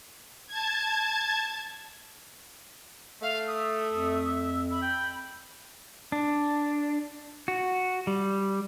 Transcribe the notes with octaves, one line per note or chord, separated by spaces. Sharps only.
A5 G#6
A3 F5
E5 D#6
F2
E5 B5
G5
D4
F#4
G3